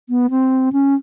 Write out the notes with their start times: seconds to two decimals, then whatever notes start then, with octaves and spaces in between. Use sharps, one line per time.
0.09 B3
0.30 C4
0.73 C#4